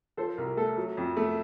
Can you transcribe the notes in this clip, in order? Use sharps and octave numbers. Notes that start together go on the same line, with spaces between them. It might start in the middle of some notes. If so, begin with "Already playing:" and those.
F3 A4 C5
C2 A#4
A3 A4
F#3
F2
A3